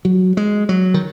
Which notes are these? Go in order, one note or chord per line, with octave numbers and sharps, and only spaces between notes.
F#3
G#3
F#3
D#3